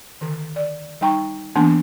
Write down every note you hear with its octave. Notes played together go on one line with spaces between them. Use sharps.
D3 D#3
D5
G3 D#4 G5 A#5 C#6
E3 A#3 B3 D4 G#5 C6